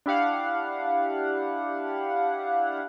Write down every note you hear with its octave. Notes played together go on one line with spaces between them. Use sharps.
D4 E4 G4 F5 F#5